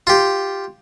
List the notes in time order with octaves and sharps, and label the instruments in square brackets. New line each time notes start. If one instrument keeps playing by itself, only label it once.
[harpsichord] F4 G4